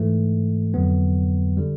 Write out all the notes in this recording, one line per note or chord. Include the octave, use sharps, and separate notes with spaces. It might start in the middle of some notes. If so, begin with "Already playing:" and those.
Already playing: G#2 E3 A3
F2 D3 F#3 B3
D3 G3